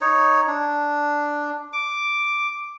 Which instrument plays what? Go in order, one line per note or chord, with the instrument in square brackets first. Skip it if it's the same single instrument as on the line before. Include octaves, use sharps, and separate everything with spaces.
[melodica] D#4 C#5
D4
D6